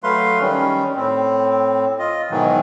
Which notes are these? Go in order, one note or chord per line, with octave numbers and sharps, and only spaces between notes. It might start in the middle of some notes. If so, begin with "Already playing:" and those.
F#3 A3 B4 F5 C6
D#3 G3 C#4
A2 C4
F4 D#5
G#2 B2 D#3 E3 F#3